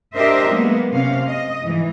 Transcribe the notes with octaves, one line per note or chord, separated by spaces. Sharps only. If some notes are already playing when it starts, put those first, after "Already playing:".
D4 G4 A#4 C5 D#5 E5
F#3 G#3 A#3 B3
C3 C#4 F5
D#5
G#2 E3